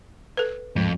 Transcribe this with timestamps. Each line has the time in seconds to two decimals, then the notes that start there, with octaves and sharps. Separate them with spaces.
0.37 A4 B4
0.76 D1 F2 G#2